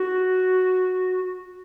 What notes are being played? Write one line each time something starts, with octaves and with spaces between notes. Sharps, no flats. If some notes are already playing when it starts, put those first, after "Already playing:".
Already playing: F#4